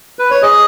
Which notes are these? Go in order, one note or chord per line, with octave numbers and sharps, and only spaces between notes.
B4
C#5
G#4 D#5